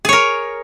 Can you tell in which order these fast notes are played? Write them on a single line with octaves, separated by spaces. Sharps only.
G#4 C#5 A#4